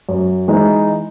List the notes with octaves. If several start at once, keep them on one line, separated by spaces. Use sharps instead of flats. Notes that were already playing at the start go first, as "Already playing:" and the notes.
F#2
E3 G#3 D#4